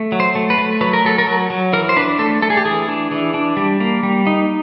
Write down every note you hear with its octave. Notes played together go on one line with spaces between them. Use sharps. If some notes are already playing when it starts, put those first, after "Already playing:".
Already playing: A3
F#3
C5
A3
B4
A3
F#3 B4
A#4
F#3 A4
A#4
F#3
F#3
E3 A#4
C5
D4 B4
A3 A4
A3 A4
G#4
G4
E3 G#4
D4
E3
D4
G3
A#3
G3
D#4